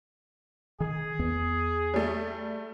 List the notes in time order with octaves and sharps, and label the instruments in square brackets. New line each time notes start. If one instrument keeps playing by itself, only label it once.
[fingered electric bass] D#3 [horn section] G#4
[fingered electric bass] E2 B3
[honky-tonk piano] G3 A3